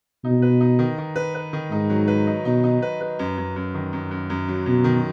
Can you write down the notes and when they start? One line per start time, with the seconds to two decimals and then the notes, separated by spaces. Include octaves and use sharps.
0.24 B2 D#4
0.42 B4
0.61 D#4
0.79 D#3
0.98 D#3
1.16 B4
1.35 B4
1.53 D#3
1.71 G#2 D#4
1.90 F#3
2.08 B4
2.27 D#4
2.45 B2 D#4
2.64 D#4
2.82 B4
3.01 B4
3.19 F#2
3.38 F#2
3.56 F#2
3.74 D#3
3.93 F#2
4.11 F#2
4.30 F#2
4.48 F#3
4.66 F#2 B2
4.84 D#3